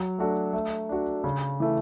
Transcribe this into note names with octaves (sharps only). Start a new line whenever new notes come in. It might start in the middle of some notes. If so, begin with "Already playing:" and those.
Already playing: F#3
A3 D4 F#4 A4
A3
D4 F#4
C#3
E3 A3